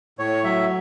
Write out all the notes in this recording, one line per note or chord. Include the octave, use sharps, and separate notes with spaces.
A2 C#5
F#3 E5